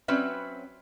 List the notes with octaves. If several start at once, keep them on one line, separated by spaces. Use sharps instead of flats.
F#3 C4 C#4 B4 E5